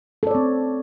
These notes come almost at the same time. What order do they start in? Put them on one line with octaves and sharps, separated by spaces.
A4 D5 C#5 C4